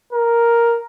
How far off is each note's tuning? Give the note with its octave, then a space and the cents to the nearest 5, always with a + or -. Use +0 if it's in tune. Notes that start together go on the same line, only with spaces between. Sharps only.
A#4 +5